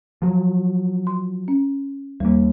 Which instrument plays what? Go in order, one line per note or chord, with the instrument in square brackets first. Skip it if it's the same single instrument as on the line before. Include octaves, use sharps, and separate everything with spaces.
[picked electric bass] F3 F#3
[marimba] C6
C#4
[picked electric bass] D#2 A#3 [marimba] G3